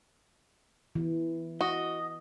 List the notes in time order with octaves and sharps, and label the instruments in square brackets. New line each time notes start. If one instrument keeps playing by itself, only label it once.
[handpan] E3
[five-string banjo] F#4 [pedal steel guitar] D#5